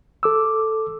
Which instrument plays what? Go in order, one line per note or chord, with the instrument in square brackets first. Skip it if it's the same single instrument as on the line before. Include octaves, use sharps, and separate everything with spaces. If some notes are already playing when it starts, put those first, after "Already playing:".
[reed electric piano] A4 D6 E6